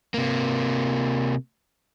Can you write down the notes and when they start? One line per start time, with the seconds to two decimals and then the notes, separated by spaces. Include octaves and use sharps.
0.14 C3 A#3